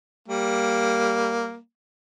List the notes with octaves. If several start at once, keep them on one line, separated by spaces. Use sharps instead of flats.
G3 A#3